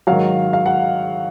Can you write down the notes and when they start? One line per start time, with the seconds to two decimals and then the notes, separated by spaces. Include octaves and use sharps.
0.07 G#2 D#3 F#3 F5
0.53 F5
0.66 F#5